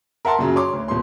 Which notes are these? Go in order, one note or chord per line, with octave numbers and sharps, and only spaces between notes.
A#4 E5 F#5 A5 C6
F#2 A#2 C#3 F#3
C#5 C6 D6
D2
D#1 B2 C6